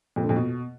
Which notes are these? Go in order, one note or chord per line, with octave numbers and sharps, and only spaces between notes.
F2
D3
F2
B2